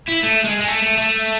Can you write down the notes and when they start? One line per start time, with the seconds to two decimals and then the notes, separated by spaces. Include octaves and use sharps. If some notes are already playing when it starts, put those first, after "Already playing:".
0.09 E4
0.24 A3
0.45 G#3
0.61 G#3
0.68 A3
0.82 A3
0.98 A3